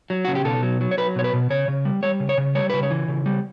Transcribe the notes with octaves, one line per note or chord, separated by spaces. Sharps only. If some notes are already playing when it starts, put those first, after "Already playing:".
F#3
C#3 F#4
G4
B2 A4
F#3
F#3
C#5
F#3 B4
B2 C#5
B4
B2
C#3 C#5
C#3
G3
G3 C#5
C#3
C#5
C#3
G3 C#5
C#3 B4
C#5
E3
C#3
G3